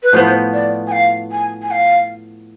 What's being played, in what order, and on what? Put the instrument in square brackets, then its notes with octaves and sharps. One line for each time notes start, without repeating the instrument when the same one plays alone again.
[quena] B4
[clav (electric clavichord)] A2 F3 B3 [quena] C5
[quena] D5
G#5
F5
G#5
G#5
F5